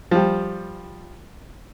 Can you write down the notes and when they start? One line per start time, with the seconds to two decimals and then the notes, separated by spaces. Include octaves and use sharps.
0.11 F3 G3